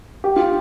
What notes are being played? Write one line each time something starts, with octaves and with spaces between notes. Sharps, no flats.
G4
F4